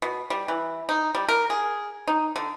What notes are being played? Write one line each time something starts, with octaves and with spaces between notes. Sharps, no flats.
B2
G3
E3
D#4
G3
A#4
G#4
D#4
D3